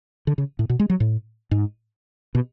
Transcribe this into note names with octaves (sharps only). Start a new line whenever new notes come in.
D3
C#3
A2
B2
G#3
F#3
A2
G#2
B2